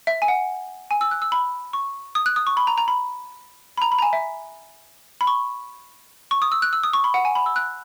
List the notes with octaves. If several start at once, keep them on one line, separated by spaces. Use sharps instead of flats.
E5
G#5
F#5
G#5
E6
F#6
E6
B5
C#6
D#6
F#6
D#6
C#6
B5
A#5
A#5
B5
B5
A#5
B5
A#5
G#5
E5
B5
C#6
C#6
D#6
E6
F#6
E6
D#6
C#6
B5
F#5
G#5
B5
E6
F#6